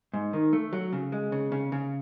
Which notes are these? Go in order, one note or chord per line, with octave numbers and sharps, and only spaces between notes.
G#2
D#3
A3
F#3
C#3
G#3
C#3
C#3
C#3